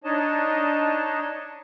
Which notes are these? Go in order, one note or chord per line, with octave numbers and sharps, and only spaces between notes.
D4 D#4 C#5 D#5 A5